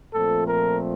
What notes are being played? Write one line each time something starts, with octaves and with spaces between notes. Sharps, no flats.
A#2 F3 A3 C4 A4
A#4